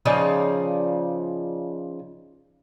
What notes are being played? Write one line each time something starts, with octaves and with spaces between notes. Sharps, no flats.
C#3 F3 D#4 D5